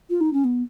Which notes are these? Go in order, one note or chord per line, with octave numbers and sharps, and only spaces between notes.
F4
D#4
C#4
B3